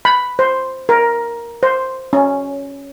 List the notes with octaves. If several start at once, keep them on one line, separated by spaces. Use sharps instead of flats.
B5
C5
A#4
C5
C#4